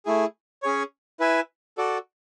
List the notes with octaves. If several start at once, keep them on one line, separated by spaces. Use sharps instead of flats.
A3 E4 G#4
C#4 G#4 C#5
E4 B4 E5 G#5
F#4 A4 D5